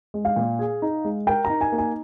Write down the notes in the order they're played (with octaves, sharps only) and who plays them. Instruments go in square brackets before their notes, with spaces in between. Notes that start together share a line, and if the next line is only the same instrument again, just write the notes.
[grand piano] G#3
[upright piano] F5
[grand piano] A#2
G#4
D#4
G#3
[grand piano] A#4 [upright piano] G5
[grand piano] D#4 [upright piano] A#5
[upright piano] G#5
[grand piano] A#3
[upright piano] G#5